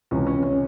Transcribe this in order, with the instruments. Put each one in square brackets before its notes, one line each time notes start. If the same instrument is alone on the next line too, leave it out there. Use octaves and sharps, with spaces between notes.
[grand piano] C#2 C3 E3 C#4
C#4
C#4